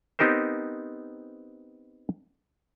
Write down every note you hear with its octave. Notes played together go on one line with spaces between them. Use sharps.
B3 C4 D#4 G4 A#4 C5